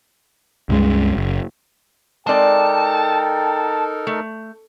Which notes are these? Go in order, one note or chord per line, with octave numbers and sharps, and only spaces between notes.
C#2 G2 C#3 G#3
F#1
G#3 C4 D#4 A4 A#4 D5 G5 A5
A3